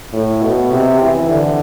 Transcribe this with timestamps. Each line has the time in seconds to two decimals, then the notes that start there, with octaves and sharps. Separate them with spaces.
0.13 A2
0.42 B2
0.72 C3
1.00 E3
1.29 D3